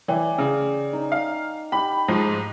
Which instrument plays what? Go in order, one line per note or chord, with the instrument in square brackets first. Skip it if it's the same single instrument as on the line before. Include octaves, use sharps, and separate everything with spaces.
[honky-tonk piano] E3 [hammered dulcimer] D5 G5 G#5
[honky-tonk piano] C#3
[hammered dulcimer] D#4
[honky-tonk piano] F5
[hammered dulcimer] G4 [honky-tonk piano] B5
[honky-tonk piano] G#2 F3 G#3